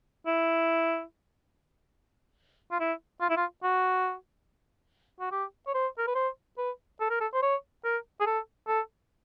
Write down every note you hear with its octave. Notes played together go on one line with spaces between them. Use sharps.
E4
F4
E4
F4
E4
F4
F#4
F#4
G4
C#5
C5
A#4
B4
C5
B4
A4
A#4
A4
C5
C#5
A#4
G#4
A4
A4